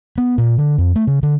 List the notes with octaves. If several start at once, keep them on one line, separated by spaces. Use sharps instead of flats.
B3
A#2
D3
F2
A3
C#3
D3